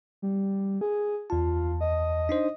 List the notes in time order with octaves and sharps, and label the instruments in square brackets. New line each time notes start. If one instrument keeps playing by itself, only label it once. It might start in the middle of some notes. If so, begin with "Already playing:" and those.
[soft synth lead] G3
G#4
[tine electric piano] E2 A5 [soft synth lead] F4
[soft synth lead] D#5
[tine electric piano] D4 D#4 C5